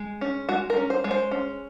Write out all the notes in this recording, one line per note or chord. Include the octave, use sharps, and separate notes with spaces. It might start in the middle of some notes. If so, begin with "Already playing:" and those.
Already playing: G#3
C#4
G#3 F#4
A#4
C#4
C5
G#3
C5
C#4